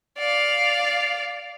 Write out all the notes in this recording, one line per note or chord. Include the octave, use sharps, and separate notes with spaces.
D5 F5